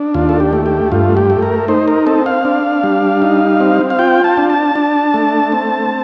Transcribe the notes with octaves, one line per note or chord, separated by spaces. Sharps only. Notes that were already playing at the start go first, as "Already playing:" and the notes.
Already playing: D4
D#2 F4
A4
G4
A3
G4
G2 F4
G4
A3
A#4
D#4 C5
A#4
C4 A4
F5
D4
G3
D#4
C4
F5
F4 G5
A5
D4
A5
D4
A3
C4